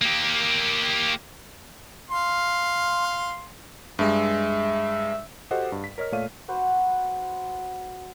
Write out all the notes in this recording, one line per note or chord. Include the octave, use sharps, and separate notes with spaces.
A#3 G4
F5 C6
G2 G#3 E5
F#4 G4 A4 C5 D#5 F#5
G2
B6
A#4 C#5 D#5 F6
A#2 A3 C#5 D5 F5 D#7
F#4 B4 C5 F#5